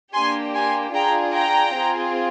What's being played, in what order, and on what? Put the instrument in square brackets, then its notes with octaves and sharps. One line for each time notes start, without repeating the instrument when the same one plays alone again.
[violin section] A#3 D4 G4 G#5 C6
G#5 C6
D4 F4 G#4 G5 A#5
G5 A#5
C4 F4 G#4